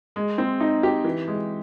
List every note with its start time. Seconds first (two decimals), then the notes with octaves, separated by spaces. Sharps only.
0.16 G#3
0.38 C4
0.60 D#4
0.83 G4
1.04 E3
1.28 G#3